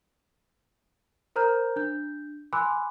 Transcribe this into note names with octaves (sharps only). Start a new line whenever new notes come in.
A#4 C5 A#5 F6 G6
D4 G6
G#5 B5 C6 D6 E6 F#6